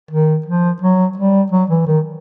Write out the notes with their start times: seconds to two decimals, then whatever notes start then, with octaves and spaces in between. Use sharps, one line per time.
0.11 D#3
0.46 F3
0.82 F#3
1.18 G3
1.52 F#3
1.70 E3
1.87 D#3